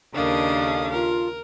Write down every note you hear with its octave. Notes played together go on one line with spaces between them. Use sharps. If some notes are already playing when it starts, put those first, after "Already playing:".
D#2 C#3 D4 A4 A#4 D#5 F5
F4 A#4